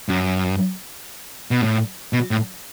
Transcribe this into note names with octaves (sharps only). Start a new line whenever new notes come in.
F#2
B2
A2
B2
A2